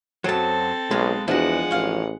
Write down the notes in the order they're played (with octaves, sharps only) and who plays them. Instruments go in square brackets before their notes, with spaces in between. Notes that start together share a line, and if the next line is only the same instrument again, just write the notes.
[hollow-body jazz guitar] F#2 F#3 [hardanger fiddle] C4 A4 [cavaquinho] C5 A5
[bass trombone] B1 [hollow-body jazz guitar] G#3 [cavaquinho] B4 F5
[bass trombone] E2 [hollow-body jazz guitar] F3 D4 [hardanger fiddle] G#3 F#5 [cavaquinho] E4 F#4
[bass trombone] A1 [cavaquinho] C#5 F5